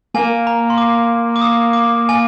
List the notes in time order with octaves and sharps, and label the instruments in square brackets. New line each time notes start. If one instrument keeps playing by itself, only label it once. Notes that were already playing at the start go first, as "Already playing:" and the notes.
[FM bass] A#3 [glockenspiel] G#5
[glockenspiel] A#5
C6
D6
D6
D#6
D6
G#5